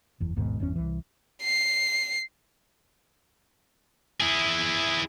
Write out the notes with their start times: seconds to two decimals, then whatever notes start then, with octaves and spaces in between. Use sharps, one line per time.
0.20 F#1 E2
0.36 G#1 D#2 G#2 B2
0.60 G1 E2 C#4
0.76 C2 E3
1.43 C7
4.21 E4 G#4